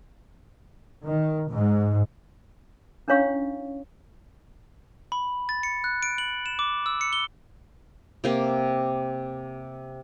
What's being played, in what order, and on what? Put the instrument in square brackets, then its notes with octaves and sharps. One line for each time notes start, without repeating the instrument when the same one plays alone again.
[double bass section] D#3
G#2
[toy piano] C#4 D4 E4 C#5 F5 C#6
[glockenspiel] B5
A6
C#7
F#6
D7
F#7
E7
D6
E6
C#7
G7
[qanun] C3 A#3 G4